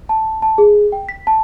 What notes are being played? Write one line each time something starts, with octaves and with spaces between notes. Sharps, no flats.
A5
A5
G#4
G5
B6
A5